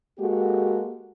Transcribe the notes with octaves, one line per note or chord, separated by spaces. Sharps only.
G#3 A#3 F#4 G4 A4